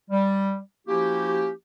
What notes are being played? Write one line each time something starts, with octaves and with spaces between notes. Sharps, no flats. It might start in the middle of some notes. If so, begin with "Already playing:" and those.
G3
F3 A#3 C#4 E4 F#4 G4